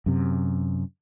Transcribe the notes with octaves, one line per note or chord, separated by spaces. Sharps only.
F#2 C3